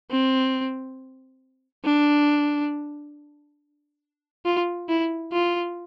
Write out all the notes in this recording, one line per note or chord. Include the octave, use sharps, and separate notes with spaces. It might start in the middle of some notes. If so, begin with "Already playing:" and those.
C4
D4
F4
E4
F4